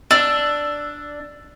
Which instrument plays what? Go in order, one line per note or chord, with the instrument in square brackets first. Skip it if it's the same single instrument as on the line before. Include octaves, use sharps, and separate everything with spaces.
[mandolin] D4 [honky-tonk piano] E6